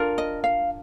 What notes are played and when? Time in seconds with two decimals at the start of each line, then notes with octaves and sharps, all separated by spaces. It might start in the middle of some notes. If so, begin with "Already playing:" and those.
Already playing: D4 F4 A#4
0.18 D#5
0.44 F5